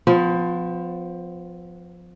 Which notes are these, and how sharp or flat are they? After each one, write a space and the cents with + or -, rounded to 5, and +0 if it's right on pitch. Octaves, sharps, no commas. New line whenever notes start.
F3 +15 B3 +40